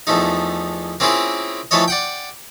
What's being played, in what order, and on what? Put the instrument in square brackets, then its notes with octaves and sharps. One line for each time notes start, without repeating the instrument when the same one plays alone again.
[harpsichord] E2 F3 A3 D#4
A#3 C4 C#4 E4 F4 G#4
E3 F3 A3 A4 C#5 D#5
D5 F#5 G5